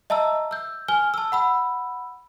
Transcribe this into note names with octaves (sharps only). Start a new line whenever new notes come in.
D#5 E5 A5 A#5 E6
E6 G6
G#5 F6 G7
A5 E6
F#5 B5 E6